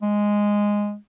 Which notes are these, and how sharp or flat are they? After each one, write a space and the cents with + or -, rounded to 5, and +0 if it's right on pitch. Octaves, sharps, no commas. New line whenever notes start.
G#3 -5